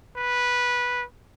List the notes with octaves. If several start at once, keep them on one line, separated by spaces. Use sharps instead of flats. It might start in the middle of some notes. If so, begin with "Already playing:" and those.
B4